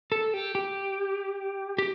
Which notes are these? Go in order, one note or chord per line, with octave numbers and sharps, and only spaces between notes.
A4
G4
G4
G4